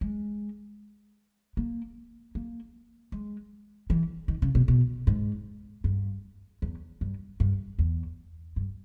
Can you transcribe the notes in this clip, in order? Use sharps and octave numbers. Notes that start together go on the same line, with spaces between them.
G#3
A#3
A#3
G#3
E3
D#3
C#3
B2
B2
G#2
G2
E2
G2
G2
E2
G2